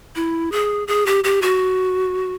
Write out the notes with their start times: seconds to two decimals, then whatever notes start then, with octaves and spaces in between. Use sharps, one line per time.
0.16 E4
0.52 G#4
0.88 G#4
1.06 G4
1.24 G4
1.42 F#4